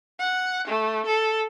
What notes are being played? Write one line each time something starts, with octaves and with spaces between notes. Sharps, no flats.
F#5
A3
A4